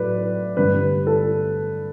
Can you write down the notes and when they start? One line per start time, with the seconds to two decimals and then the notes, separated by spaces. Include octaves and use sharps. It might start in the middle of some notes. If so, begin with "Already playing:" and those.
Already playing: A2 F#3 A3 B4 D5
0.57 G2 D3 G3 B4
1.07 A4